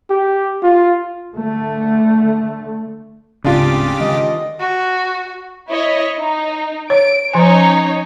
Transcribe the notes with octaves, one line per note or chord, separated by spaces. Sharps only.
G4
F4
D3 A3
D1 G#2 C#3 C4 D4 F4 G4 D6
D3 D#3 G#3 D#5
F#4
E4 C#5 D#5
D#4
C#5 D7
F3 C#4 D#4 C#5 G#5